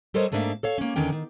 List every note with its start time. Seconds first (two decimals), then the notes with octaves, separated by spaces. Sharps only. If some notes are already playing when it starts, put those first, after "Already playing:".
0.14 G3 A4 A#4 C5 C#5 D#5
0.32 G#2 A3 A#3 D4 E5 F5
0.63 A4 C#5 F5
0.78 A#3 C#4
0.96 E2 D3 D#3 C#4 G5
1.12 D#3